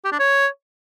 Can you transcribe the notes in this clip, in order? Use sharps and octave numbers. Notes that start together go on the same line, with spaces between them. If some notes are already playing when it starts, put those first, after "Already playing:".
G4
D4
C#5